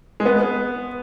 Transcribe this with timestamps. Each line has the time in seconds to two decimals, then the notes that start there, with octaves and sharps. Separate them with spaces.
0.20 G#3
0.25 B3